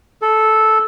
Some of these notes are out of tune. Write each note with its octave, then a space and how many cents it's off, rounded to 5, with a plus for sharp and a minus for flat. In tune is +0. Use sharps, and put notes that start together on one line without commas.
A4 -10